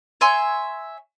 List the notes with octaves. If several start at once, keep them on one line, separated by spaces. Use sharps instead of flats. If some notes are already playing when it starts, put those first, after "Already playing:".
C#5 E5 G#5 C6